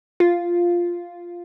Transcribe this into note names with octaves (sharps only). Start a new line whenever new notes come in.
F4